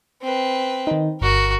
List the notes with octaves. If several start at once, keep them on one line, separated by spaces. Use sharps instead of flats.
C4 B4
D#3 D#4
G1 F#4 A#4